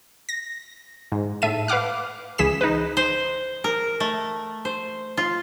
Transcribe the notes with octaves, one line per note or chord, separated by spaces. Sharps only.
A#6
G#2
A2 E5 A5 D#7
B4 F5 F#5 D6 F6
C#2 E3 G#4 B6 E7
D#4 B4
C5
A#4
A3
C5
F4